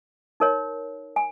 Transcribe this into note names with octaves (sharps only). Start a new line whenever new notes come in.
D#4 A#4 C#5
G#5